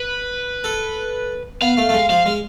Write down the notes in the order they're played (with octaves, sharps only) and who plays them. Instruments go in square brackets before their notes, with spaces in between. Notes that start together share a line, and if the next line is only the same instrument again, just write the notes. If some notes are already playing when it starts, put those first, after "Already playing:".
Already playing: [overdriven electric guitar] B4
[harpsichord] A4
[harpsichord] B3 [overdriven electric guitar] F5
[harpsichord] A3
A3
G#3
[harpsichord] F3 [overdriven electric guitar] F5
[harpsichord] G#3